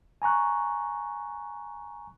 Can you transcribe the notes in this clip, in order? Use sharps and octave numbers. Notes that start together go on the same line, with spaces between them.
G#5 A#5 C#6 F#6